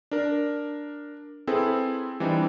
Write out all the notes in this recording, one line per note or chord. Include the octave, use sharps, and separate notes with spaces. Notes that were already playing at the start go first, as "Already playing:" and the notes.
D4 A#4
C4 E4 G#4 A4 B4
E3 G3 C4 D4 D#4